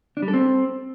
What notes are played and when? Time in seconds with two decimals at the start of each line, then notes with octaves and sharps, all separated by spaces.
0.17 D4
0.22 G3
0.28 A4
0.34 C4